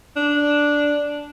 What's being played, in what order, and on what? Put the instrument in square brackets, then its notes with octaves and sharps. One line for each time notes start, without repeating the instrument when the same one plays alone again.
[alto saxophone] D4